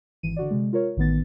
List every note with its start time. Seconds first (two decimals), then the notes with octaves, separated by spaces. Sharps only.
0.23 G#1 E3 D#7
0.36 D3 F#4 D5
0.51 C3 G#3
0.73 F4 A#4 C#5
0.97 A1 D#3 B3 A6